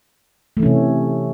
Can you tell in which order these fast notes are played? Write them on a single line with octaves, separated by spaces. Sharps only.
A3 E3 C#4 C3